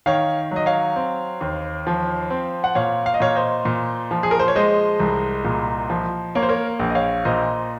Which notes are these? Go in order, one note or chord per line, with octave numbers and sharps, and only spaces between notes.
D#3 C#5 F5
F#3 D#5
C#5 F5
C4
D#2
F3
C4
F#5
A#2 C#5 F5
F5
D#5
A#2 C#5 F5
C5 D#5
A#2
F3
G#4
A#4
C5
C#5
G#3 C5 D#5
C2
A#2
F3
A#3 C#5
C5
A#4 C#5
A#1
D#5
C#5 F5
A#2 C5 D#5